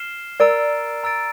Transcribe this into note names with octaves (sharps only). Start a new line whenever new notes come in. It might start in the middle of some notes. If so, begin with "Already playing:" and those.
Already playing: F6 C7 E7 G7
A#4 D5 A#5 E6 A6 D7
A#5 E6 A6 D7